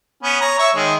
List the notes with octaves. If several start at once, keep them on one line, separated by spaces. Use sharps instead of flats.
B3 C#4
C#5 A#5
C#5 E5 C#6
D#3 G#3